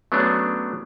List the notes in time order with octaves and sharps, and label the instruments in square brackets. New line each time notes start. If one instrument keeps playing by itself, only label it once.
[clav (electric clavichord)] F#3 A3 B3 C#4 D4 G#4